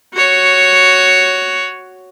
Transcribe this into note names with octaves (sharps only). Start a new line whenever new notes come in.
F#4 C#5